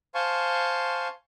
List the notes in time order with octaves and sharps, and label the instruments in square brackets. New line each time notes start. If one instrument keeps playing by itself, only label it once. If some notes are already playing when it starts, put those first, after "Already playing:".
[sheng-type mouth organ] C5 F5 G#5 A5 C6 C#6